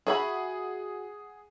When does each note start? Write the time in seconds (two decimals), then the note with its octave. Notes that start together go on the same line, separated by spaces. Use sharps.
0.07 F#4 G#4 E5 F#5 B5